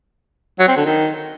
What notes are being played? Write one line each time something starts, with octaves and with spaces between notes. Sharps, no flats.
F#3
C4
D3
D#3